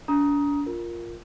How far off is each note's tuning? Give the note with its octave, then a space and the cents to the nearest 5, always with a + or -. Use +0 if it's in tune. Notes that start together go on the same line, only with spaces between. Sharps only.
D4 -40 A#5 +15 D#6 +15
F4 +0 A#4 +0